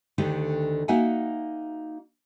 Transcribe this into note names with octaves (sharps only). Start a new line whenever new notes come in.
D2 D3 D#3 A3 G4
A#3 D#4 F#4 E5 F#5 G#5